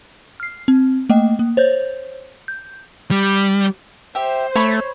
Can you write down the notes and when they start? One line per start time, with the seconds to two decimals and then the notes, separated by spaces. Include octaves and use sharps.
0.40 F6 C7
0.68 C4
1.10 A3 A#3 D#5 G5
1.39 A#3
1.57 C5 C#5 G6
2.48 G6
3.11 G3
4.15 G4 C5 E5
4.56 A3 C#5 B5 C#6